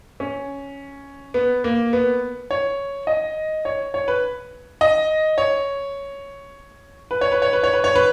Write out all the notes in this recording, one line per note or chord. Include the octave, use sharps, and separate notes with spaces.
C#4
B3
A#3
B3
C#5
D#5
C#5
C#5
B4
D#5
C#5
B4
C#5
B4
C#5
B4
C#5
B4
C#5
B4